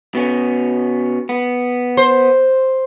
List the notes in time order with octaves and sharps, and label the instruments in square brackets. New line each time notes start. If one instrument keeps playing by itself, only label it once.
[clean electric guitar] B2 B3 C#4
B3
[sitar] C5